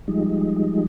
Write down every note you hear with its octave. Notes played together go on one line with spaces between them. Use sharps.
F3 G3 G#3 D#4